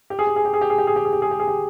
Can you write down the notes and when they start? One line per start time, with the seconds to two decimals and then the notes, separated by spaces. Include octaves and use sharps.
0.10 G4
0.19 G#4
0.27 G4
0.36 G#4
0.45 G4
0.54 G#4
0.61 G4
0.70 G#4
0.78 G4
0.87 G#4
0.96 G4
1.05 G#4
1.13 G4
1.22 G#4
1.31 G4
1.39 G#4
1.48 G4